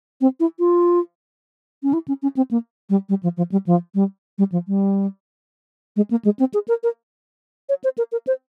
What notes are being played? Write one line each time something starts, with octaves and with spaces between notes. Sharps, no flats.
C4
E4
F4
C#4
E4
C#4
C#4
C4
A#3
G3
G3
F3
F3
G3
F3
G3
G3
F3
G3
G#3
A#3
G#3
C4
G#4
A#4
A#4
C#5
C5
A#4
A#4
C5